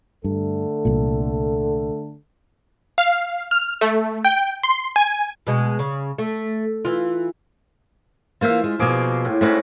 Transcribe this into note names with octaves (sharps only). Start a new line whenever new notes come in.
G2 D3 A3 A4
C2 A#2
F5
F6
A3
G5
C6
G#5
B2 G#3
C#3
A3
E3 F4
E3 A#3 F4 C5 E5
G#3
B2 F3 A#3 G#4 D6
A2
G#2 A3 C4 C#4 F#4 B4